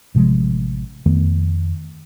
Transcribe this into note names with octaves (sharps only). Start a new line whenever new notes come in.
A1 C3 F3 G#3
F2 D#3 A3 B3